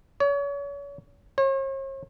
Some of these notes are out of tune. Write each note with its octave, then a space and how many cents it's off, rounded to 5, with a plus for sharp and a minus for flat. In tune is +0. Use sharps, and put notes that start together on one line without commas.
C#5 +35
C#5 -45